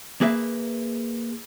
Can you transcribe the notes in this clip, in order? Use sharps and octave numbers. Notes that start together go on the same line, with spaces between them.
A#3 G#4 B4 E5